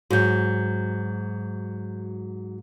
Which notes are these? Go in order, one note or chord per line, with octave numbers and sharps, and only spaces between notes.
G#2 F#3 F#4 G6